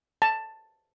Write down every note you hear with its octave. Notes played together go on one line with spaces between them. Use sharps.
A5